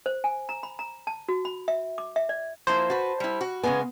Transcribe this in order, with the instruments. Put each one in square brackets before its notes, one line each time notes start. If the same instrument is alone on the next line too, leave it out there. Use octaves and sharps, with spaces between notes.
[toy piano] C5
G#5
A#5
B5
A#5
A5
F#4
B5
E5
D6
E5
D5
[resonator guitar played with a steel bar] F3 A#3 E4 [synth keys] C5
[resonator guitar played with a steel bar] F#4 B4 [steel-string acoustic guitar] A5
[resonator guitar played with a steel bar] G3 E4
F#4
[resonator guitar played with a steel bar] C#3 G#3 G#5 [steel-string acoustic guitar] B3